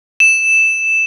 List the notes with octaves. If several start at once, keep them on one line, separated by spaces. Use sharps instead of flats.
E7